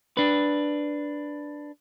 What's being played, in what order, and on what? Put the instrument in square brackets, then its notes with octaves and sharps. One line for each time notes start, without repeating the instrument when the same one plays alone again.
[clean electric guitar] D4 B4